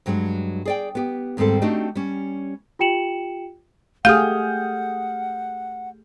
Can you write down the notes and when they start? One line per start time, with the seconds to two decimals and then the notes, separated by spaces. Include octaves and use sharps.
0.06 G2 F#3 G#3 B3 D4
0.65 G#4 D5 G5
0.95 B3 G4
1.37 D#2 G#2 G3 C4 A4
1.62 A3 C4 D4 D#4 F#4 G4
1.95 G3 C#4
2.79 F4 G4 G5 C#7 E7 F#7
4.05 A3 G4 G#4 F5 F#5 D#6 F6 G6